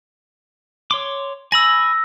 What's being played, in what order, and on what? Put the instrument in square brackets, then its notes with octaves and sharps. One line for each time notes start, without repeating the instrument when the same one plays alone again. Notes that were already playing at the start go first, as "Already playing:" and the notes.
[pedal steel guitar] C#5 C6 D6
[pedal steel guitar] G#5 B5 [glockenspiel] E6 A#6